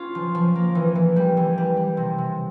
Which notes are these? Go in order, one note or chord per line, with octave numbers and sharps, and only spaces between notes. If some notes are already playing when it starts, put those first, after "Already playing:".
Already playing: C#4 F4
F3
F3
A#3
E3
E3
G3
E3
G3
G3
C3
C3